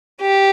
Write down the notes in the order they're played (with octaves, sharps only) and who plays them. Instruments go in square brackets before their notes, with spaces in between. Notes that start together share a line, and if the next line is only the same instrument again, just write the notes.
[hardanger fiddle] G4